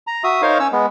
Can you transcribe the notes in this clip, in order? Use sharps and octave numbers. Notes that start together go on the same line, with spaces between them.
A#5
F#4 E5 D#6
D#4 A#4 C5 C#5 F5
C#4 C#5 E6
G#3 B3